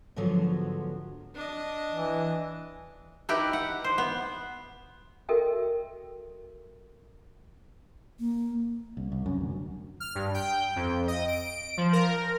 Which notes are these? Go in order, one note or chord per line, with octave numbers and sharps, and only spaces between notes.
G#2 D3 F3 F#3 B3
D4 D#5
E3
D#4 E4 G4 B4
F#5
C5
B3
F#4 A4 A#4 D#5 E5 G5
A#3
C2
C2
F#2
D2
F6
G2
G5
F2
D#5
D7
F3
A#4